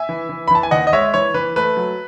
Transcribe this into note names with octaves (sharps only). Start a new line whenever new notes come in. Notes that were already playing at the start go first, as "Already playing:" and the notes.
Already playing: E5 G#5
E3
E3
B5
E3 A5
G#5
D#2 D#5 F#5
D#5
G#3 C#5 E5
E3 C#5
E3 B4
A3 B4
F#3